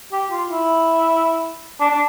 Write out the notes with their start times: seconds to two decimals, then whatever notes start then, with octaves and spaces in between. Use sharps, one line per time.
0.12 G4
0.31 F4
0.50 E4
1.80 D4
1.91 D4